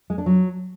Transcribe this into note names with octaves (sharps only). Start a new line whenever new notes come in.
G#3
D4
F#3